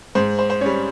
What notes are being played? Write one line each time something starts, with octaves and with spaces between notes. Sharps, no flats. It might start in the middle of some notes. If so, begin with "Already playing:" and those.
G#2 C5
C5
C5
G3 C#4 C#5